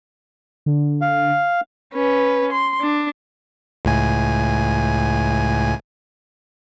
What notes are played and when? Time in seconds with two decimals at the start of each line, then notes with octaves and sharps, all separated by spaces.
0.66 D3
1.01 F5
1.94 C#4 B4
2.52 C6
2.81 D4
3.85 C#2 A2 G#5